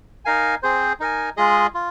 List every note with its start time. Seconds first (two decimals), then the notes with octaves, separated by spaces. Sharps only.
0.25 D#4 A#4 F5 G#5
0.63 C4 G#4 C5
1.00 D#4 A#4 G#5
1.37 G#3 F4 G#4 D#5
1.74 F4